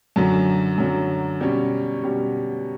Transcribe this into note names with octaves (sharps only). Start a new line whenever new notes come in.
F#2 D3 F#3
F#2 D3 F#3
B2 G3 C#4
B2 G3 C#4